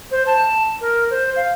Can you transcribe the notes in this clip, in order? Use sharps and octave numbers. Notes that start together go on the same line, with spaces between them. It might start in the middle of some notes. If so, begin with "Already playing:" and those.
C5
A5
A#4
C5
F5